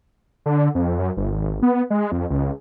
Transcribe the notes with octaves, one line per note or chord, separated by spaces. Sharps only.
D3
F2
F#2
G1
G#1
B3
G#3
F2
C#2